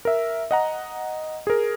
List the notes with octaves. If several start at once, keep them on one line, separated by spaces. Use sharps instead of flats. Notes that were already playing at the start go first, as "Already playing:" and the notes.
A#4 E5
D#5 F#5 A#5
G#4 A#4